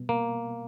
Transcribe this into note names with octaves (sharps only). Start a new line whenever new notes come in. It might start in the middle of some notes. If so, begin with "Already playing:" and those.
Already playing: B2 G3 B3
A#3